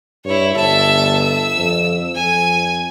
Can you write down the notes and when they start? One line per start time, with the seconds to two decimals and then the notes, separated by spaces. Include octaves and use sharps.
0.25 G2 E4 C#5
0.56 G1 E5 A5
1.22 E6
1.57 F2
2.15 F2 G#5